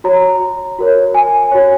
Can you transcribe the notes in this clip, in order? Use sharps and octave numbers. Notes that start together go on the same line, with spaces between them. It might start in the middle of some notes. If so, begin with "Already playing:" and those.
F#4 C#5 A#5
F#4 A#4 C#5
G#5
F#4 C#5